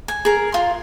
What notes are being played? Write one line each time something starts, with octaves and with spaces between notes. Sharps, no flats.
G#5
G#4 A#4
F4 C6